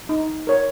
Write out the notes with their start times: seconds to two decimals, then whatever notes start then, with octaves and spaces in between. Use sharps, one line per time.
0.09 D#4
0.47 A#4 C#5